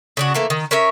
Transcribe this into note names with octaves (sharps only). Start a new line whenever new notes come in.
C#3 D4 F#4
E3 A3 A#3
D#3
C#4 A#4 C#5 E5